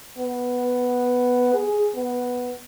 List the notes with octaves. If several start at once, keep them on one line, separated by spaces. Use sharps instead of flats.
B3
G#4
B3